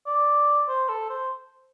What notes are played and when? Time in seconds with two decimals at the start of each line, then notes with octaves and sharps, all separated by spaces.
0.06 D5
0.68 C5
0.89 A4
1.10 C5